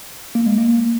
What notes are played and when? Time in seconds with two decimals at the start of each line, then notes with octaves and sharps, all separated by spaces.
0.35 A#3
0.46 G#3
0.58 A#3